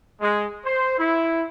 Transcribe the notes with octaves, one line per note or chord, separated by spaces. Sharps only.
G#3
C5
E4